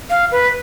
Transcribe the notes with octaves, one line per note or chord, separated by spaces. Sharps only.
F5
B4